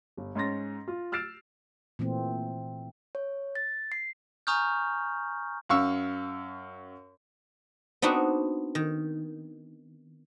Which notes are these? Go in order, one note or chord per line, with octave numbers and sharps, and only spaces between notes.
G1
G#2 C#4 C6 A6 A#6
F4
E6 F6 A6 C7 D7 E7
A#2 E3 A3 C4
C#5
A6
C7
G#5 A#5 C#6 D#6 F6 G6
F#2 F5 C#6 E6
B3 C4 D4 D#4 F#4
D#3